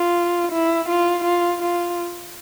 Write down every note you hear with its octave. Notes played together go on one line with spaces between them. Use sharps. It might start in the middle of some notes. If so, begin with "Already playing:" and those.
Already playing: F4
E4
F4
F4
F4